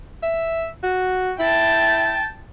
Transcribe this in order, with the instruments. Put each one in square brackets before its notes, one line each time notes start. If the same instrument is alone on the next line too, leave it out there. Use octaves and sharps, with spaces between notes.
[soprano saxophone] E5
F#4
[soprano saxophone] E4 [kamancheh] G5 A5